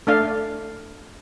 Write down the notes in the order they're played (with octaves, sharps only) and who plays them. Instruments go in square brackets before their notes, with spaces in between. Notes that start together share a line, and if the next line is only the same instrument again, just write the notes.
[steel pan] A3 D4 F5